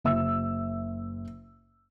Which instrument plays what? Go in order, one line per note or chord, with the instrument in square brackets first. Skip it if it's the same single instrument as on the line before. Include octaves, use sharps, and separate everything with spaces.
[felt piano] F#1 E5 E6